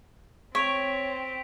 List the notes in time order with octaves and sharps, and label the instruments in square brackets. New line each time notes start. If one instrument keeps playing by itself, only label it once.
[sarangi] C4 [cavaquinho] C#5 [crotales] B6 D7 F7